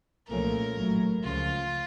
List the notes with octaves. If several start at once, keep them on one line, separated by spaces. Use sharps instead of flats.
C2 A#2 F3 A3 C#4 A#4
A1 A2 F#3
C#2 C#3 F3 F4